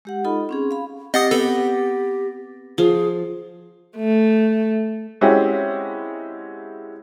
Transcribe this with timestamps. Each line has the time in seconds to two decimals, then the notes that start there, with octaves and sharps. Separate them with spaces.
0.05 G#3 G4 F#5
0.25 D#4 F4 A4 D#5 B5
0.49 C4 C#4 G#4
0.71 F5 B5
1.14 C4 G4 D#5 F#5 D#6 A6 A#6
1.31 B3 A4
2.78 F3 G#4
3.97 A3
5.21 G#3 C4 C#4 E4 F#4 G4